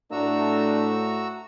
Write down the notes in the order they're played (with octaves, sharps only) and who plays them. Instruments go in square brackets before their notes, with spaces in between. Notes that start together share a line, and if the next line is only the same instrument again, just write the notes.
[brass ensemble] A2 A3 [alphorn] D4 [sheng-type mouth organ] F#4 A#5 E6